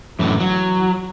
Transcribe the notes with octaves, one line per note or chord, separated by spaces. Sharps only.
F#2 A2 D3 E3
F#3